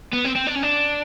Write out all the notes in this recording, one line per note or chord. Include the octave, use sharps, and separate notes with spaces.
B3
C4
C4
D4
C#4
D4